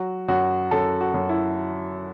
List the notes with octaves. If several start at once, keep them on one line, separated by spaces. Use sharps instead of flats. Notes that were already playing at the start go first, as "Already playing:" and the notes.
Already playing: F#3 F#4
F#2 F#4
F#2 A4
F#4
F#2
E4